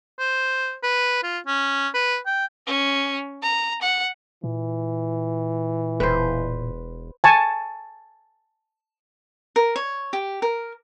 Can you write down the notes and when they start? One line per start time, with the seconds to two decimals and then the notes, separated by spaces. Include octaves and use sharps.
0.19 C5
0.83 B4
1.23 F4
1.46 C#4
1.94 B4
2.26 G5
2.67 C#4
3.43 A#5
3.82 F#5
4.44 A#2 E3
6.00 E1 B4 C5
7.24 G#5 A5 C#6
9.56 A#4
9.76 C#5
10.13 G4
10.42 A#4